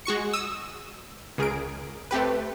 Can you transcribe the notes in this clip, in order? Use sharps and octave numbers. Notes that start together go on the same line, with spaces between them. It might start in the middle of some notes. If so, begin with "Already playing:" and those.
G#3 F#4 C#6 C#7
D#6 E6
C#2 G#4 A#4 D7
A3 C4 G4 B4